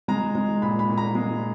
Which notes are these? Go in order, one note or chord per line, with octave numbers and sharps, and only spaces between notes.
G#3 A#5
G#3
A#2 B5
B5
A#2
A#5
G#3